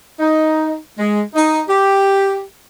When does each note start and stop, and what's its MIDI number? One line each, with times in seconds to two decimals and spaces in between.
0.20 0.77 63
0.98 1.20 56
1.35 1.61 63
1.69 2.42 67